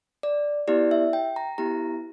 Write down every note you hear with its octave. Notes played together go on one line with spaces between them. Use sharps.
D5
B3 E4 G4 D5
E5
G5
A#5
B3 E4 G4 A#5